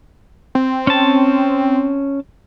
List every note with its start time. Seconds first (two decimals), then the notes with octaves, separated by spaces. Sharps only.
0.55 C4
0.87 C#4 A5